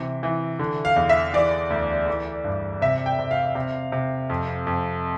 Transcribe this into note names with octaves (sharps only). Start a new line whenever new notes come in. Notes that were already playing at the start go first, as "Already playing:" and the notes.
Already playing: C3 E3
E3
D3
F5
E2
E5
E3 D5
D2
E3
G2
C3 E5
G5
C3
F5
C3
C3
F2
F2